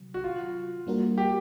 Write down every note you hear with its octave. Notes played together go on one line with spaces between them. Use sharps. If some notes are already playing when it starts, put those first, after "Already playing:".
Already playing: C3 D#3 F#3
F#4
F4
G3 A#3 D4 F#4 A#4
G4